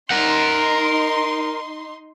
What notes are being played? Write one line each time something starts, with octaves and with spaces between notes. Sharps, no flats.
D#4 A#4 F#5 C6